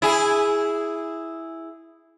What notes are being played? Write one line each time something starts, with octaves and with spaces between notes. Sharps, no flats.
E4 G#4